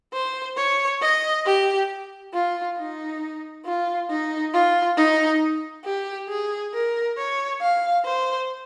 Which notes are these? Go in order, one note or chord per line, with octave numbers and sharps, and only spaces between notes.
C5
C#5
D#5
G4
F4
D#4
F4
D#4
F4
D#4
G4
G#4
A#4
C#5
F5
C5